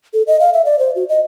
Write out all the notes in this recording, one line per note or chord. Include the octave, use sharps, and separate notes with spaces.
A4
D#5
F5
E5
D5
C5
F#4
D#5